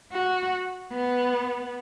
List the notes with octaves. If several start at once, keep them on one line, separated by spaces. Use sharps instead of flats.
F#4
B3